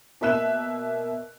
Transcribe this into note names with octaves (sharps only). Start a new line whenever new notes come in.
B2 A#3 E5 F#6 E7